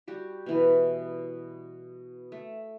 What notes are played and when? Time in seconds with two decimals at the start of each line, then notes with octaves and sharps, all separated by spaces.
0.08 G3 F#4 G4
0.46 B2 E3 B4
2.32 A3